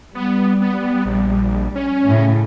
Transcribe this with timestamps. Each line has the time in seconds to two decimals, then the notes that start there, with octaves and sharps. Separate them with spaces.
0.15 G3 B3
0.62 B3
1.06 A#1
1.76 C#4
2.08 A2 C#3